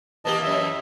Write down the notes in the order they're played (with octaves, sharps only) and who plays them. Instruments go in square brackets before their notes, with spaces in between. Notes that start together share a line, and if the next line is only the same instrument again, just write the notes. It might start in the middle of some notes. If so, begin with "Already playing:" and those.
[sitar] E3 A#3 G4 [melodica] D#5 A5
[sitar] F#2 E3 [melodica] D#5 E5